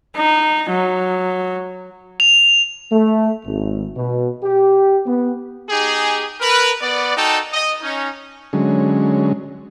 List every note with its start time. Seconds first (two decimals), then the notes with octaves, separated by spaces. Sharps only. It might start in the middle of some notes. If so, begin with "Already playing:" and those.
0.16 D#4
0.70 F#3
2.20 F7
2.91 A3
3.45 G#1
3.96 B2
4.43 G4
5.06 B3
5.69 D#4 G4 G#4
6.40 A#4 B4
6.80 B3 D5
7.15 D#4 F#4 A4 G5 A5
7.52 D#5
7.81 C#4 D#4
8.53 D3 F#3 G#3 C#4